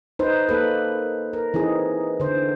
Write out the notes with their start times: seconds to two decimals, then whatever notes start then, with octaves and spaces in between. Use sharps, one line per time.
0.19 D#4 B4 C5
0.49 A#3 A4 B4
1.33 A#4
1.54 E3 C4 D#4 G#4
2.20 D3 C5